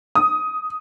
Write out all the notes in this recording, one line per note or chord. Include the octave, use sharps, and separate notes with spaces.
D#6